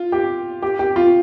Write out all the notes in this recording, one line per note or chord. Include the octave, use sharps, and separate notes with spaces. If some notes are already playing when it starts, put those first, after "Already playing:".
Already playing: F4
G4
G4
G4
F4